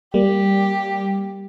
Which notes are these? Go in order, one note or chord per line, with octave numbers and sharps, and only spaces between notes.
G3 A#3 G4